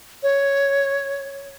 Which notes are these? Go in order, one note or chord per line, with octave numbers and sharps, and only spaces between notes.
C#5